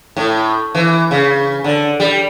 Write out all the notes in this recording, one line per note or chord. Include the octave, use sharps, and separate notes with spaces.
A2
E3
C#3
D3
G3